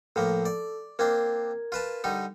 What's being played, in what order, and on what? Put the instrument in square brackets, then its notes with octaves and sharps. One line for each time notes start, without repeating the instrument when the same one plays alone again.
[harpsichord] A2 F3 A#3 [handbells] A4
[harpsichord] D5
[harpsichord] A#3 C4 D4 [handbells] A#4 G#6
[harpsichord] F4 B4 A5
D3 G3 D#4